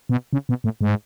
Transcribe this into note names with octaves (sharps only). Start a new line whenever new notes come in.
B2
C#3
B2
A2
G#2